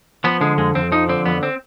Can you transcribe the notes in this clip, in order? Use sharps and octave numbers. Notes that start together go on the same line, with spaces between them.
F3 B3
D3 G#3
F2 G#3
F2 C4
F3 D#4
D3 C4
F2 B3
C4